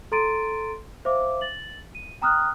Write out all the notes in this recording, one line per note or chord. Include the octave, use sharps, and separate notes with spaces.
A4 A#5 C6 A6 D7 D#7
C5 E5 F5 D6
A6 F#7
D#7
G5 A#5 D#6 F6 F#6